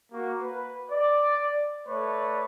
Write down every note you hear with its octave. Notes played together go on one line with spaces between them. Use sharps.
A#3 F#4
B4
D5
A3 B4 C#5 D5